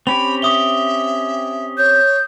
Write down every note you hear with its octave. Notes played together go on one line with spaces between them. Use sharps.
C4 C#4 G4 B5 F7
E5 D6 D#6 G7
C#5 G6